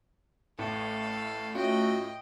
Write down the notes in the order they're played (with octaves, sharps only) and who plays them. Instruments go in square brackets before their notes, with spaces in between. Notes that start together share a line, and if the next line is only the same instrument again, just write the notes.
[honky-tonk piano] A1 A2 [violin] A4 F5
[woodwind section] A3 F#4 [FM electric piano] C#4 F4 C#6 [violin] D#5 G5